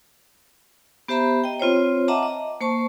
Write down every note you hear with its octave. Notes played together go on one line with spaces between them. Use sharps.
B3 G4 C5 E5 A#5 B5
D#5 G5
C4 F4 C5 C#5
D#5 E5 F#5 A5 A#5 D6
D#5
A#3 C5 A5 C#6